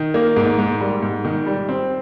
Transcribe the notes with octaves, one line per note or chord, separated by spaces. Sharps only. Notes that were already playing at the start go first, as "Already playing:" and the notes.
Already playing: D#3
A#3
G#2
G#2
G3
G#2
D#3
G3
C4